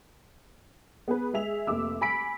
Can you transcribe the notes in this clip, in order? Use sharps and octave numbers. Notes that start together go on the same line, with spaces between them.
B3 G#4 B4
G#3 G#4 E5 F7
F1 A#3 E5 D6 E6
G#5 B5 B6 D7